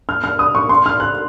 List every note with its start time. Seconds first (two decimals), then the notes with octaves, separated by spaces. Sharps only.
0.09 F6
0.24 F6
0.39 D#6
0.55 C#6
0.69 C6
0.86 F6
1.00 F#6